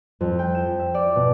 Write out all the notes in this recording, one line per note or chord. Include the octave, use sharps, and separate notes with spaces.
F2
G5
E7
E5
D5
B2